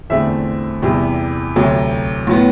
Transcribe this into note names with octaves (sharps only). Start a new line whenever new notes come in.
E2 D3 A3 C4 E5
E2 C3 G3
D2 C3 F#3
A2 F#3 B3